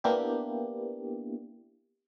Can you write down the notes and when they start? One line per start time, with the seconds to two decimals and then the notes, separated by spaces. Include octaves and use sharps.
0.04 A#3 B3 D4 E4 G4